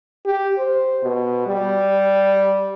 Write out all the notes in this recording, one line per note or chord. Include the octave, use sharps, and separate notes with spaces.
G4
C5
B2
G3